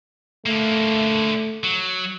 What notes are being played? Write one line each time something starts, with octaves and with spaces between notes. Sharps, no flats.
D3 A3 A#3
F#3